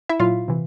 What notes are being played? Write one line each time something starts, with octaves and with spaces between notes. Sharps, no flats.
E4 E5
A#2 F#3 F4 F5
C3 E3